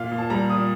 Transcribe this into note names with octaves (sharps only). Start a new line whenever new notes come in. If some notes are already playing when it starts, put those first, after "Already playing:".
Already playing: A#2 F5
A#2
A5
G3 A#5
A#2 D#6